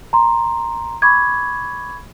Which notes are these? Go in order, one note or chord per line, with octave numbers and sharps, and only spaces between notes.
A#5 C6
B5 C#6 D6 G#6